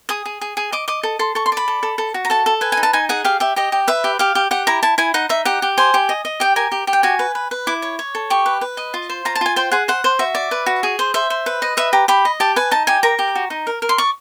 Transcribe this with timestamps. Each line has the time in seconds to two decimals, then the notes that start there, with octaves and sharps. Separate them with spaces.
0.09 G#4 D#6
0.26 G#4
0.41 G#4
0.57 G#4
0.72 D#5 D6
0.88 D#5 D6
1.03 A4
1.19 A4 C6
1.35 A4 C#6
1.46 C6
1.52 D5 B5
1.68 A4
1.83 A4
1.98 A4
2.14 F#4
2.25 A#5
2.30 A4 A5
2.46 A4
2.61 B4 G#5
2.72 G#5
2.77 D#4
2.83 A5
2.93 D#4 G#5
3.09 G#4 F#5
3.24 G4 F5
3.40 G4 E5
3.56 G4 D#5
3.72 G4
3.88 B4 E5
4.04 G4
4.19 G4 F5
4.35 G4
4.51 G4 F#5
4.67 E4 A#5
4.83 E4 A5
4.98 E4 G#5
5.14 D#4 F#5
5.29 D#4 E5
5.45 G4 F#5
5.62 G4
5.78 C5 G#5
5.94 G4
6.09 D#5
6.25 D#5
6.40 G4 G5
6.56 A#4 G#5
6.72 G4
6.87 G4
6.93 G5
7.03 F#4 G#5
7.19 B4
7.35 B4
7.51 B4
7.67 E4 D6
7.82 C#5
7.99 C#5
8.15 A4
8.30 G4 C#6
8.46 B4
8.61 B4
8.77 D#5
8.94 F4
9.10 C5
9.25 F4 A#5
9.35 A5
9.41 F4 G#5
9.56 C5 G5
9.72 G#4 F#5
9.88 C5 F#5
10.04 C5
10.19 F#4 E5
10.35 D5
10.51 B4
10.66 F#4
10.83 G#4
10.99 C5
11.14 C5 E5
11.30 C5
11.46 B4
11.62 D#5
11.77 B4 E5
11.93 G4 A#5
12.08 G4 B5
12.25 D#5
12.40 G4 A5
12.56 B4 G#5
12.71 D#4 A5
12.87 G4 G#5
13.03 A#4 A#5
13.19 G4
13.35 F#4
13.50 D#4
13.67 A#4
13.82 A#4
13.89 C6
13.98 D5 C#6